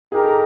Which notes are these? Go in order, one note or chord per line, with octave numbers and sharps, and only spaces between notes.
D#4 G4 G#4 A#4
A4